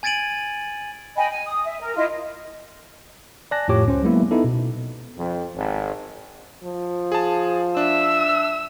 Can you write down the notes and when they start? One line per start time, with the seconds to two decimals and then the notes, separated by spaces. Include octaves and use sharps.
0.03 G#5 G#6 A6 D7 D#7 F#7
1.17 D#5 G5 G#5 B5
1.31 G#5
1.45 D#6
1.65 E5
1.80 A#4
1.96 E4 F4 D#5
3.51 D5 G#5 A5 F#6 A#6
3.68 F2 A2 F4 G4 C#5 D6
3.86 C#2 C#4 C5
4.03 F#3 G#3 A#3 B3 E4 E5
4.31 B3 D#4 E4 A4
4.44 B2
5.16 F2
5.55 G#1
6.64 F3
7.12 G#4 A5
7.77 D4 E5 E6